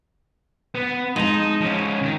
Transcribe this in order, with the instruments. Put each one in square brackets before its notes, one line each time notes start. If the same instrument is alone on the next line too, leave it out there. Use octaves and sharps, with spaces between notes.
[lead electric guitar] B3
[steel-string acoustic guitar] G#3 A5 [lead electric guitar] D#4
[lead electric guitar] F3 C#4
D#3